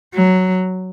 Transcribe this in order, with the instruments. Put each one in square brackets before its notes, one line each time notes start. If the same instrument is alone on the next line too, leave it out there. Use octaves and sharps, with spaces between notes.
[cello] F#3